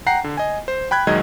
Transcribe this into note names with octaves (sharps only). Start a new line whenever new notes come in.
F#5 G5 A#5 C7
D3
D#5 G#5
C5
G5 B5 F#6 G#6
A#1 D#3 F#3 G#3 D#5 G#6